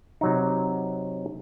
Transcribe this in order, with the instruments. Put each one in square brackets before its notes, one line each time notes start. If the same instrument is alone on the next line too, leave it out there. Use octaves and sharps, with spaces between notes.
[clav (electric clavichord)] C3 F#3 D#4